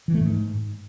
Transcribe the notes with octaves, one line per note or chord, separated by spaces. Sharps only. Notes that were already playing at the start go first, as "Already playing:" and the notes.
E3
A3
G#2